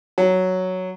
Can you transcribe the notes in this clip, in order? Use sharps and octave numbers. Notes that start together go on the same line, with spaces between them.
F#3